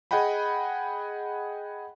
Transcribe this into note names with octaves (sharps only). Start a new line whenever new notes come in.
G#4 D#5 F#5 G5 B5